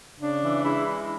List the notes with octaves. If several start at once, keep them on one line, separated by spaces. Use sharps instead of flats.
C#3 D4
E3
G#3 E4